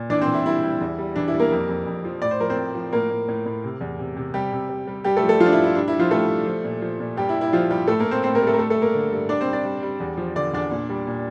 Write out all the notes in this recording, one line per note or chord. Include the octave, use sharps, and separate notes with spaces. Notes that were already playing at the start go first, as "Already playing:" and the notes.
Already playing: A#2
E3 D4 D5
C4 C5
E3
E4
G3 E4
G3
E2
G3
E3 D4
E4
G3
A#3 A#4
F2
F2
F2
F3
A2 D5
C5
F3 A#4
C4 C5
A2
F3
A2 A#3 A#4
A2
A2
A2
C3
E2
C3
C3
C3 G3 G4
C3
G3
G3
G2 G3 G4
A3 A4
F3
A3 A4
F3 F4
D4
E4
G2
E4
G3 D4
E4
G3
F3 F4
G3 A3 A4
G3
F3
A#2
F3
A#2
G2 G3 G4
E4
G2
E4
G2 F3 F4
G2 G3 G4
A2 A3 A4
A#3 A#4
A2
C4 C5
A2 C4 C5
A#3 A#4
G3
A3 A4
A#4
G2 A3 A4
A3 A4
G2
A#3 A#4
D3
G2
G3 D4 D5
C4 C5
G3
D4 D5
G3
G3
E2
F3
D3 D5
E2 D4 D5
A#2
G3
A#2